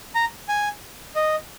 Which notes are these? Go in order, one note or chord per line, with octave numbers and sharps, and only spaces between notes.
A#5
G#5
D#5